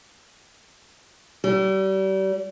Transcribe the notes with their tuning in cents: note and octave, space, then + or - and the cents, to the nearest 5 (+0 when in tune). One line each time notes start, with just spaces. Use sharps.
G3 -35